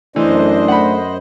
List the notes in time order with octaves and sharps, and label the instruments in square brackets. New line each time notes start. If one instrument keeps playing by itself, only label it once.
[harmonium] F#2 C5 D#5 [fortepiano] E3 [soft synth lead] A3 [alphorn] D4
[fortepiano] F#5 B5